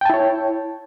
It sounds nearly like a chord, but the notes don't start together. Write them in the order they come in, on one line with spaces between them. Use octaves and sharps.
G5 A5 E4 C#5